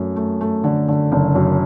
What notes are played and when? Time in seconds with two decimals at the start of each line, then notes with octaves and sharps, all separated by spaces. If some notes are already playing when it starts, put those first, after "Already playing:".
Already playing: F#2 A3
0.16 A3
0.41 A3
0.64 D3
0.88 D3
1.12 F#1
1.35 F#2